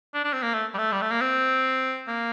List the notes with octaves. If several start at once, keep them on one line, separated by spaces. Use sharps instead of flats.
D4
D4
C4
A#3
A3
G3
A3
G3
A3
A#3
C4
A#3